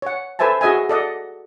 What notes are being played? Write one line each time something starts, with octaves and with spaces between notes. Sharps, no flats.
C#5 F#5
A4 B4 C5 E5 G#5 A5
F#4 G#4 D#5 E5 G#5
A4 D5 D#5 F#5